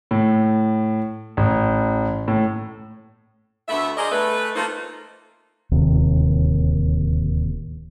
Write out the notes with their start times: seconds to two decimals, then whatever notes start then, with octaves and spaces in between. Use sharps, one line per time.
0.11 A2
1.37 A1
2.28 A2
3.68 D2 A3 B3 E5
3.97 G#4 A#4 C5 D5 D#5
4.11 A3 B4
4.55 A3 A#3 C4 D#4 F4 C5
5.72 D1 D#2 C3